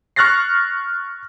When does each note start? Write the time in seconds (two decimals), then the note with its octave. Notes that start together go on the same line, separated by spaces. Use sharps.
0.16 C#6 F6 F#6 A6 A#6 C7